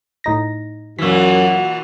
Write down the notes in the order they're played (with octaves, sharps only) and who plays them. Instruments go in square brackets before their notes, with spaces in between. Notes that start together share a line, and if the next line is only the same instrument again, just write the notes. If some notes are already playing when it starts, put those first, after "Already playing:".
[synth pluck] A2 D#4 A#6
[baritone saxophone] F#2 [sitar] A#2 E3 [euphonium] F#4 [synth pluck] E6 B6